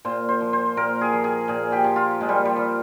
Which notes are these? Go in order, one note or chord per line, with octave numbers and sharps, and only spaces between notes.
A#2 C5
C5
F3
C5
A#2 A#4
G#4
F3
G#4
A#2 G#4
G4
F3
F4
A#2 G#3
G3
G3
F3